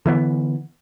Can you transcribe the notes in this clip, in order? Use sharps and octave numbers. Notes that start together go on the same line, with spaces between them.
D3 E3 A3 B3